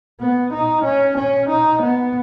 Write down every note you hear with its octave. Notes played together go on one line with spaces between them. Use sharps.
B3
D#4
C#4
C#4
D#4
B3